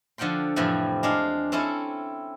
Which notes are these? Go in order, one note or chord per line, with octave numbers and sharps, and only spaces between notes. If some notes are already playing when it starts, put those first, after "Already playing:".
D3 F3 F#5 G5 C6
F2 A2 C3 E3 F3 G3
G#3 D4 F5
C4 C#4 E4 A4